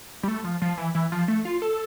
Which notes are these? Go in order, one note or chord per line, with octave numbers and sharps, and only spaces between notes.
G3
A3
F3
F3
E3
E3
F3
A3
F4
A4